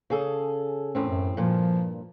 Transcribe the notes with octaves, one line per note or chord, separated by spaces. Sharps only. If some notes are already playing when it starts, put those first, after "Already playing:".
C#3 G#4 A4
E2 A2 C4 C#4
F#2
G2 A#2 F3